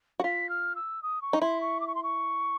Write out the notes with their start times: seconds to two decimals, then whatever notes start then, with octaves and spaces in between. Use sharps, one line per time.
0.20 F#4
0.24 F4 B6
0.49 F6
0.76 E6
1.03 D#6
1.22 C#6
1.33 D#4
1.41 E4 C6
1.61 C#6
1.80 D6
1.87 C#6
1.95 C6
2.03 C#6